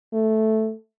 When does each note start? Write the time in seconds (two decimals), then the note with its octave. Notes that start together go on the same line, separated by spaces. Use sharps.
0.13 A3